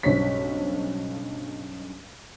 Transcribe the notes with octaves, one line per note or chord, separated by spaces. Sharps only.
B1 G2 C#3 C5 C#5 B6